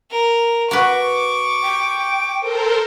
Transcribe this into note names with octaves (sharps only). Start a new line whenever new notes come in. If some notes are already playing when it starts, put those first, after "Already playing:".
A#4
F#4 B4 C#6 D6
G5
A4 A#4 C5